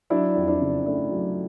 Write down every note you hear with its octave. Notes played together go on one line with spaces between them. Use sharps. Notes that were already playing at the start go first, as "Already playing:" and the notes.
F#3 D4 E4
F2
D4 E4
C#3
A3 D4 E4
F#3